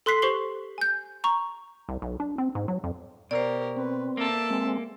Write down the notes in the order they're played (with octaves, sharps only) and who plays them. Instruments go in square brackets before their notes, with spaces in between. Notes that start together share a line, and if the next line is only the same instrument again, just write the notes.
[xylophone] A4 C6 F#6 B6 C7
G4 C5 C#6 C7 F#7 G7
G#5 G6
A#5 C#6
[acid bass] C2
B1
D4
C4
G#2
F#3
F2
[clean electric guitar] B2 [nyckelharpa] G4 A#4 [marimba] C5 D5
[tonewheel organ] C4 [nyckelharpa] B4
[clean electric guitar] A#3 A4 [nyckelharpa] E5 A5
[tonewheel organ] G#3 C4